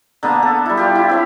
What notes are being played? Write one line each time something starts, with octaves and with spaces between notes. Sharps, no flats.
D3 A#3 B3 D4
A4
G3 E4
E4 F4 G4
E4
C4 C#5 B5